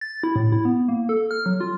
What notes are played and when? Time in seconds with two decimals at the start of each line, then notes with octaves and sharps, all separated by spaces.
0.01 A6
0.23 E4
0.36 A2
0.52 E4
0.65 B3
0.88 A#3
1.09 A4
1.31 F6
1.46 F#3
1.61 F4